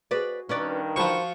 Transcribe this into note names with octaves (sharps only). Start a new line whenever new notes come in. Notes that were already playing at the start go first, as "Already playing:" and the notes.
F#4 G#4 B4 D5
G2 D#3 C#4 B4 D5
F3 F4 F#4 C5 A5 B5 C#6